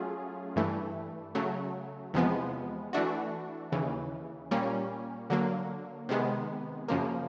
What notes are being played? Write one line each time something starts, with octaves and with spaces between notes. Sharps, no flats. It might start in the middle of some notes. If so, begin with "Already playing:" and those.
Already playing: F#3 A3 C#4 F4 G#4
G2 E3 A3
C#3 F#3 A3
E2 C3 F3 G#3 B3
E3 A3 D4 F#4
D#2 C#3 E3
A#2 G3 A#3 C#4
D3 F#3 A#3
C3 D#3 G#3 B3
F#2 C#3 F3 A#3